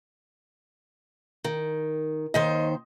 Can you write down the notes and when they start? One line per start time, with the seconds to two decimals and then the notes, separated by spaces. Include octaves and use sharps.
1.44 D#3
2.34 D#2 D#3 C5 D#5